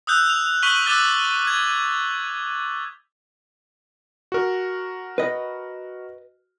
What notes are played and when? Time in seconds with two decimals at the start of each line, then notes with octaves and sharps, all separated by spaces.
0.07 D#6 E6 F#6 G6
0.30 F7
0.62 C#6 F6 B6 D#7 F#7 G7
0.86 D6 E6 F#6 A6 G7
1.47 G#6
4.32 F#4 A#4
5.18 B4 D#5